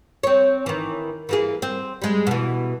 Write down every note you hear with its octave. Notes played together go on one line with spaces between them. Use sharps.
C4 C#5
D#3 E3
E3 A#3 G#4
C4
G3 G#3
B2 E3